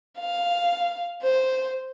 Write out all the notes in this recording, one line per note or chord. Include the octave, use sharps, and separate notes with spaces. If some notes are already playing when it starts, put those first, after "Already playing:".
F5
C5